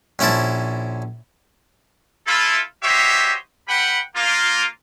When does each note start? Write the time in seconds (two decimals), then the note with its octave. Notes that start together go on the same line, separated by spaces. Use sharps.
0.19 A#1 C#4 E4 C5 A5
2.27 E4 F4 A4
2.83 F#4 G4 C5 C#5 D#5 E5
3.68 G3 B4 F#5 G5 B5
4.16 A#3 F4